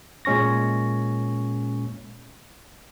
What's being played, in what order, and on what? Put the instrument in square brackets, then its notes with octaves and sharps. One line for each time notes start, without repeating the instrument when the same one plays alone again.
[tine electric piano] A#2 G#3 C#4 C#6 A#6